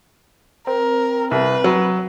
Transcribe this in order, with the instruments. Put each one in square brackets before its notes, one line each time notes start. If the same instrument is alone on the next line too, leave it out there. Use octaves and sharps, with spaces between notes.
[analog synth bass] C4 [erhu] A#4
[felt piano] C2 [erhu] B4
[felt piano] F#3